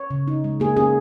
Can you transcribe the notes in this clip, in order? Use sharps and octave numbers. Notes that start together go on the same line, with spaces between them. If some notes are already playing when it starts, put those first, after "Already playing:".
Already playing: C#5
C#3
D#4
G#3
A#3 G#4
C#4 G#4